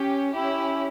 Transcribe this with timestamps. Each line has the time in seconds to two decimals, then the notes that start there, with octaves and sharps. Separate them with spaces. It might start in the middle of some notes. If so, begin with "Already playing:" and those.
Already playing: C#4 G4
0.32 C#4 E4 G4